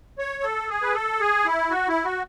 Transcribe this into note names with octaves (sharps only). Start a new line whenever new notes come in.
C#5
A4
G#4
B4
A4
G#4
E4
F#4
E4
F#4